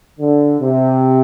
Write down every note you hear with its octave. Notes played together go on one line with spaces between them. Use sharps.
D3
C3